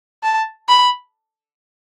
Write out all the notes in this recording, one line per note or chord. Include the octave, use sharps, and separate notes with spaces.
A5
B5